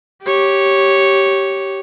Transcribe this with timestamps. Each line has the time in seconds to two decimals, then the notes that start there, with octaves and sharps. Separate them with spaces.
0.24 G4 C#5